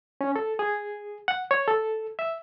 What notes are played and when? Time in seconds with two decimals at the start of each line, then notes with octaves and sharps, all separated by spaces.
0.21 C#4
0.36 A4
0.59 G#4
1.28 F#5
1.51 C#5
1.68 A4
2.19 E5